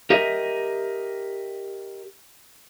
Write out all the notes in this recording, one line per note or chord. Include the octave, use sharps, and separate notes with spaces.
G4 A#4 D#5 E5